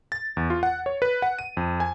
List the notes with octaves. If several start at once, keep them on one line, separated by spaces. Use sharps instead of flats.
A6
E2
F4
F#5
C#5
B4
F#5
D#7
F2
G#5